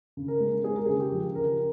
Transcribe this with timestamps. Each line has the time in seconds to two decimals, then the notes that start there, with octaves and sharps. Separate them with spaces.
0.17 C#3
0.28 A#4
0.40 G#3
0.64 G#3 G#4
0.75 A#4
0.86 C#3 G#4
1.00 G4
1.12 F3
1.35 C#3 A#4